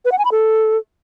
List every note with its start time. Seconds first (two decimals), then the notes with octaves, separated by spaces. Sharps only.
0.05 B4
0.12 F#5
0.18 G#5
0.25 B5
0.32 A4